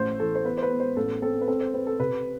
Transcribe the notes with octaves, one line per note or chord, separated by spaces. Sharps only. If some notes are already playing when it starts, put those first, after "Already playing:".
Already playing: A1 A3 C5
E3 A4
C5
B3 B4
C5
B4
B3
C5
A1 A4
C4 A4
B4
C4 A4
C5
C4 B4
A4
C3 B4